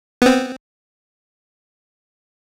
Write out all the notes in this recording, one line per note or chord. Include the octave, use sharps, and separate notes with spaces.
B3 C4